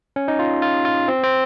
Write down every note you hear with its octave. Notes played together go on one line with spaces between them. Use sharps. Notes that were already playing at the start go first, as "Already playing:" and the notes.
C#4
D#4
F4
F4
F4
C4
C4